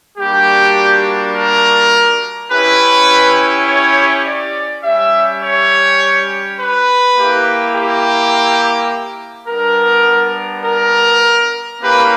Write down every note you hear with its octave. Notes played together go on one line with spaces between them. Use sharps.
G3 A#3 D4 F#4 G4
A#4
C#4 E4 G4 B4
C#5
D5
G3 C#4 G4 E5
C#5
B4
A#3 E4 G4
G4
G3 B3 D4 A#4
A#4
A#3 C#4 E4 G4 B4